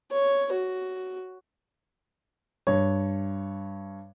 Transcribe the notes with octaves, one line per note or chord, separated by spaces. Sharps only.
C#5
F#4
G2 C#5